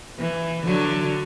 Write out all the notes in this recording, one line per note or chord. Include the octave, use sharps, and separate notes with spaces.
E3
D3 F#3